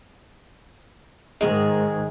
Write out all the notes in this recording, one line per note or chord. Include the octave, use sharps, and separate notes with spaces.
G#2 D#3 G#3 G#4